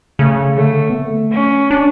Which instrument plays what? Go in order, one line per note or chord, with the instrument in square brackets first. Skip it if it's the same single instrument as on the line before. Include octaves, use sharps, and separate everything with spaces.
[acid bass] C#3 [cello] A3
[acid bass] D3 [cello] A3
[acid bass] B3
A3
[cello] C#4
[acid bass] D4